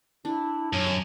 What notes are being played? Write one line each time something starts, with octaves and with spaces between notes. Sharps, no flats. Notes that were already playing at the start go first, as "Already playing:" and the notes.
D4 E4
F#2 C#5
C#4 G#5